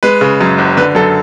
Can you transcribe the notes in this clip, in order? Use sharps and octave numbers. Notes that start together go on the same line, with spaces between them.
G#3 B4
C#3
F#2
F#1
D3 B4
F#2 A4